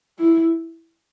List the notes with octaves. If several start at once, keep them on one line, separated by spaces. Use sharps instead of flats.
E4